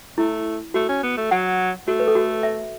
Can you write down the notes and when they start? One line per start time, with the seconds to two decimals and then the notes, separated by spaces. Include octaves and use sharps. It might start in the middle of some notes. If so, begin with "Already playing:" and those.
0.18 A3 E4
0.74 A3 F#4
0.89 C#4
1.03 B3
1.17 A3
1.31 F#3 F#5
1.87 A3 F#4
2.00 B4
2.07 A4
2.15 F#4
2.43 E5